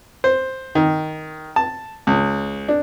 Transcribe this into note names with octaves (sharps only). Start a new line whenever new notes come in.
C5
D#3
A5
C#2
D4